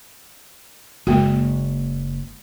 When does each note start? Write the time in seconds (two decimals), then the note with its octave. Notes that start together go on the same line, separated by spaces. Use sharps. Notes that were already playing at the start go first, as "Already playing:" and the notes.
1.07 F#1 G#3 A#3 F#4